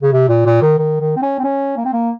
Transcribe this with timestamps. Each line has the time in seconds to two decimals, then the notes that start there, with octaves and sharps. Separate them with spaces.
0.03 C#3
0.13 C3
0.29 A#2
0.46 A#2
0.62 D#3
0.78 D#3
1.00 D#3
1.17 C4
1.22 C#4
1.39 C4
1.44 C#4
1.77 A#3
1.85 C4
1.93 A#3